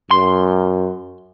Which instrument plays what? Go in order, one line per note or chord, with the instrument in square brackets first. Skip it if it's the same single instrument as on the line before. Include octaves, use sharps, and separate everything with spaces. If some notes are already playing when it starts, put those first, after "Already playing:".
[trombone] F#2 [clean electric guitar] C6